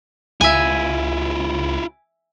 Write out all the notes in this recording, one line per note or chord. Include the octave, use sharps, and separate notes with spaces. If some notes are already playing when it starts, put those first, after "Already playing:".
C#2 E4 F4 E5 G#5